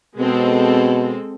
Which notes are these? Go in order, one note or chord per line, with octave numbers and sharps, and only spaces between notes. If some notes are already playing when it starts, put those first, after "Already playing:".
B2 G#3 C4 A4